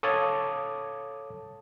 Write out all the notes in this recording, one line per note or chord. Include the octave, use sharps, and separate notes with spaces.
A4 C#5 F5 A5 D6 D#6